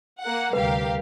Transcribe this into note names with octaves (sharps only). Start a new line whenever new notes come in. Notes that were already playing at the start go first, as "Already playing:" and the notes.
A#3 F#5
D2 C3 G3 G4 A#4 B4 F5